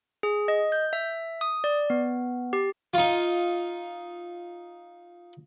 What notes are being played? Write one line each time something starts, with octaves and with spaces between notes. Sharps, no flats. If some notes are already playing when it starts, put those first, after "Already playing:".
G#4
D#5
G6
E5
D#6
D5
B3
G4
D#4 F4